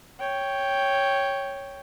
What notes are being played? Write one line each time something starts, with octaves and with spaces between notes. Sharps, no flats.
C#5 G5